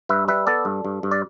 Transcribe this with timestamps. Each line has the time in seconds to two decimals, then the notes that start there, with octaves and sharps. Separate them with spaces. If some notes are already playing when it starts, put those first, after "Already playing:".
0.09 G2 B4 E5
0.28 G3 B4 E5
0.47 B3 A4 D5
0.65 G2
0.85 G2
1.03 G2
1.11 D5